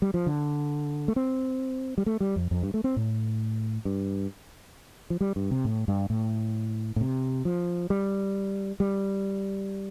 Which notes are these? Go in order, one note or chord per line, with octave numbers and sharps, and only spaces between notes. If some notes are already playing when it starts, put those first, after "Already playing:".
G3
F3
D3
A3
C4
G3
A3
G3
F2
F2
G2
A3
C4
A2
G2
F3
G3
G2
C3
A2
G2
A2
A2
C3
F3
G3
G3